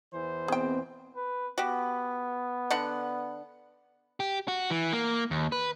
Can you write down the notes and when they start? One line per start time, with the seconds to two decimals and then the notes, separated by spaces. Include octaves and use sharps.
0.13 E2 E3 C5
0.48 B2 C4 G#4 G5
1.16 B4
1.58 B3 F#4 G4
2.71 D3 F#5
4.20 G4
4.48 F#4
4.70 E3
4.93 A#3
5.31 D#2
5.52 B4